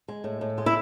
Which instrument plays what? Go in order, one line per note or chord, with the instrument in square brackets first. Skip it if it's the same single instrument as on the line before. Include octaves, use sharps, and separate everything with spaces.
[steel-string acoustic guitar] G#3
A2
A2
G#3
E4